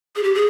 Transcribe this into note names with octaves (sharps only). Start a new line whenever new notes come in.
G#4
G4
G#4